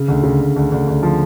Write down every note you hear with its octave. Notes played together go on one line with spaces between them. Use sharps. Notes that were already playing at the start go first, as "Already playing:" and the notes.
Already playing: C#3
D2
C#3
D2
D2
D2
D2
F3